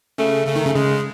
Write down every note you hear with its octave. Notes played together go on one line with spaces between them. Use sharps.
C#3 A3
C#3 A3
D#3
C#3
C#3 G#3